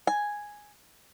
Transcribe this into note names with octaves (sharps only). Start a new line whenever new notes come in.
G#5